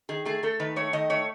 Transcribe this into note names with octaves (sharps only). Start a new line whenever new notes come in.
D#3 G#4
A3 G#4
A3 A4
D#3 B4
A3 C#5
D#3 D#5
A3 C#5